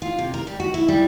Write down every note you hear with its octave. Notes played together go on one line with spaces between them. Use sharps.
F4
C3
A#4
G3
F#4
E4
G3